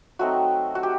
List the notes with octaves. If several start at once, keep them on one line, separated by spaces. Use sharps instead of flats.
F#3 A3 C4 D#4 F#4
F#4
G4